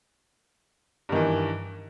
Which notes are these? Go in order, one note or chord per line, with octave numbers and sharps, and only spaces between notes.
G2 D#3 E3